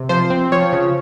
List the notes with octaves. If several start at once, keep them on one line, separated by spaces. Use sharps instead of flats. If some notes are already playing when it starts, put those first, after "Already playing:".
Already playing: C3
F3 C5
C4
F3 C#5
C#3